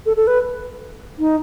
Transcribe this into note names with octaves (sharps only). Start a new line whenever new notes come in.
A4
A4
B4
D#4